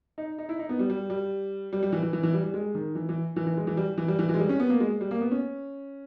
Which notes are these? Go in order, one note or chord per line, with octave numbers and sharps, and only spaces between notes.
D#4
D#4
E4
D#4
B3
G3
G3
G3
G3
G3
E3
E3
E3
E3
G3
G3
G#3
D#3
E3
E3
E3
E3
G#3
E3
G3
E3
G3
E3
E3
G#3
G3
C#4
B3
A#3
G#3
G3
A#3
B3
C#4